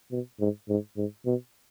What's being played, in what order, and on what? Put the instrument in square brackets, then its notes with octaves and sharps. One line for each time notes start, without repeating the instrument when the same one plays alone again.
[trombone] B2
G#2
G#2
G#2
B2